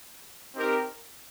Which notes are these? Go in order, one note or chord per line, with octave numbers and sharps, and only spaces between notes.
C4 D#4 G4 A#4